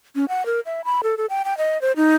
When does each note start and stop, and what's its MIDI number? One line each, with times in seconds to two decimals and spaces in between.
0.15 0.25 61
0.29 0.45 78
0.46 0.60 70
0.66 0.81 76
0.85 1.01 83
1.03 1.17 69
1.17 1.26 69
1.30 1.43 79
1.45 1.57 79
1.58 1.80 75
1.82 1.92 72
1.96 2.15 63